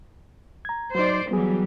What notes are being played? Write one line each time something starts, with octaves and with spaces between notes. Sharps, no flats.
A#5 G#6
F#3 D#4 C5 D5
E3 F#3 G3 B3 F#4 G#4